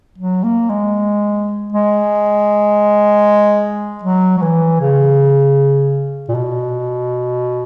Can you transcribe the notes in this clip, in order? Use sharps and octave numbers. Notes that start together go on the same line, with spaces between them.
F#3
A#3
G#3
G#3
F#3
F#3
E3
C#3
A#2
B2